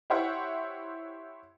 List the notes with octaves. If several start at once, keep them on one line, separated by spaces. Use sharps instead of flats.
E4 G4 C5 C#5 E5 F#5